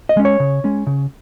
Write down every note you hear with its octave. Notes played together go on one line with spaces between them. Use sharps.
D#5
G#3 C#4
C#5
C#3
G#3 C#4
C#3